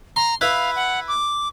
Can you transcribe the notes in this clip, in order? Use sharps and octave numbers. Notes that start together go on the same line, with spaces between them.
A#5 C6
E4 B4 F5
F#5
D6